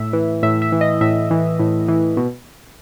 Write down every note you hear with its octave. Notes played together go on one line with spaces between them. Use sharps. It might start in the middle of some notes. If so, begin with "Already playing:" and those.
Already playing: A2 E5
E3
A2 E5
E5
E3
D#5
A2 E5
E3
A2
E3
B2